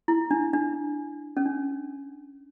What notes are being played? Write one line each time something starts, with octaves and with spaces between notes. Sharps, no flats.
E4
D4
D4
C#4
D4